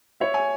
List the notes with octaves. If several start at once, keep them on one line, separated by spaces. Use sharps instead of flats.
C#5 E5
G#5